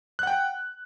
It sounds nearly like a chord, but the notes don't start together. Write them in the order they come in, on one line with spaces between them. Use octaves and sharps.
F#6 F#5 G5